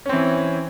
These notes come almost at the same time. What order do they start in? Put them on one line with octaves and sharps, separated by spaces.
C#4 C4 E3